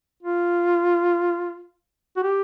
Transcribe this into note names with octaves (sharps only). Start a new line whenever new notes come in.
F4
F#4
G4